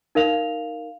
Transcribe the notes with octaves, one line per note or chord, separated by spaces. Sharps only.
D#4 A#4 F5 F7